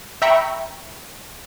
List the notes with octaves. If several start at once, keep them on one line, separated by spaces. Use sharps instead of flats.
E5 G5 A#5 B5 C#6